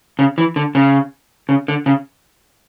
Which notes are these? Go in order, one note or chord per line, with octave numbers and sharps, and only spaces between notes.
C#3
E3
D3
C#3
C#3
D3
C#3